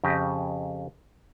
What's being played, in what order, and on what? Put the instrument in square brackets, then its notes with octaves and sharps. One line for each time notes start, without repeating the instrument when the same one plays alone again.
[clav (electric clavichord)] F2 C#3 G4 D#5